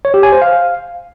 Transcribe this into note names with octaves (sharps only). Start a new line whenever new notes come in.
C#5
G4
G#5
C5
F5